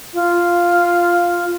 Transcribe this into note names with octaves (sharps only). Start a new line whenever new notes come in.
F4